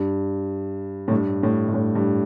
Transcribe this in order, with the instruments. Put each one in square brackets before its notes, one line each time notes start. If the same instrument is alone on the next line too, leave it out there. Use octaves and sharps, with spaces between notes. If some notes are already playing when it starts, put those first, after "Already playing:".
Already playing: [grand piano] G2
A2
G2
A2
G2
A2
G2